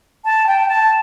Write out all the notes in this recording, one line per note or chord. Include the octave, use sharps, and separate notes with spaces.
A5
G5
A5